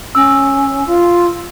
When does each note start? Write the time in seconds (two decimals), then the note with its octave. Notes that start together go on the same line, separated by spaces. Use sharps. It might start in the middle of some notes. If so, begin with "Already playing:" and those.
0.15 C#4 E6
0.87 F4